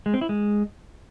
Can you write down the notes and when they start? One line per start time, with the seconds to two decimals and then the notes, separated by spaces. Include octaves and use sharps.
0.06 G#3
0.14 C4
0.21 E4
0.29 G#3